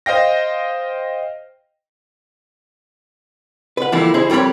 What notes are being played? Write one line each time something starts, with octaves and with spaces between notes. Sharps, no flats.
C5 D#5 F5 G5 A#6
B4 F#5
E3 F3 G3 A3 A#3 E4
D#4 E4 G#4 C5
F2 G3 A#4 C#5 B5